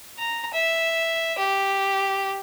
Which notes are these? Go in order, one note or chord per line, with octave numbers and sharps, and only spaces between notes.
A#5
E5
G4